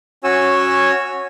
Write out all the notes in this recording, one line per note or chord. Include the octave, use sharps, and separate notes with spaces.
C#4 F#4 C#5 G#5 E6